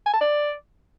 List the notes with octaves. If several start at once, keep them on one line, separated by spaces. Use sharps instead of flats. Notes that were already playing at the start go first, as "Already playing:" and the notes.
G#5
A5
D5